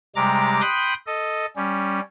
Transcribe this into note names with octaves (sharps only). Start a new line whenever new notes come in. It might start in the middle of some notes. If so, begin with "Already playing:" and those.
C3 G3 G#3 A#5 D6
G5 B5 C6 D#6 F#6 G6
A4 D#5
G3 C#4